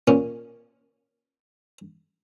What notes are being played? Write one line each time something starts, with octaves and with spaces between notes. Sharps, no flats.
A#2 C#4